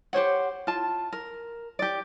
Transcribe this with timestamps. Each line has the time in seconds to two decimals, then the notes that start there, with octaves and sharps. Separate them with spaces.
0.13 G4 C5 C#5 F#5
0.67 F4 A5
1.13 A#4
1.79 G4 D5